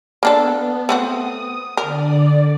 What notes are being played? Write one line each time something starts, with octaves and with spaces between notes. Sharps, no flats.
A#3 B3 D4 A4
A3 C4 F#4 D#6
D3 A#4 D5